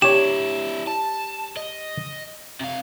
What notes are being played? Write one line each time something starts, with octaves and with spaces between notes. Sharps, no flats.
D4 E4 G4 C#5 E7
A5
D#5
C3 F5